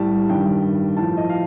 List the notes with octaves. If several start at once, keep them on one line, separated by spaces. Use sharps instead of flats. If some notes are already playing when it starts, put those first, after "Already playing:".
Already playing: A2 G3 A5
G2 D#3 G3 G5
A2 F3 A5
D#5
F5